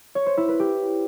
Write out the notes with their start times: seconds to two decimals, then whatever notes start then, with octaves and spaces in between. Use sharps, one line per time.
0.15 C#5
0.26 C5
0.37 E4
0.48 B4
0.60 G4